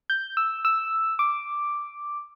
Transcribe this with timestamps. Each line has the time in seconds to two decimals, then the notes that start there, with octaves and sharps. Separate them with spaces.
0.10 G6
0.37 E6
0.65 E6
1.19 D6